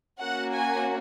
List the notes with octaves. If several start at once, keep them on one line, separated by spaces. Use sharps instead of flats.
A#3 C#4 F#4 F#5
G#5